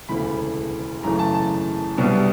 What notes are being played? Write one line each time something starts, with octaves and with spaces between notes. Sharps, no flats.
E1 D2 C#3 E3 B5
F#2 C#3 E3 A3 A#5
A5
A5
C2 B2 G3 B3 D4